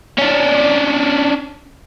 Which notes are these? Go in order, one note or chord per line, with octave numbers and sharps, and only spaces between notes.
C#4 D4